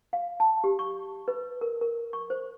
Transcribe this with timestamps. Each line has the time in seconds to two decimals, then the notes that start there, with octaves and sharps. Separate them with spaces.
0.13 F5
0.40 A5
0.64 G4
0.79 C#6
1.28 B4
1.61 A#4
1.81 A#4
2.13 C#6
2.30 C5